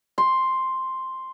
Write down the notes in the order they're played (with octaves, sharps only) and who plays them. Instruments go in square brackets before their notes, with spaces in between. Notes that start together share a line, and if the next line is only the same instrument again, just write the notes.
[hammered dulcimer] C6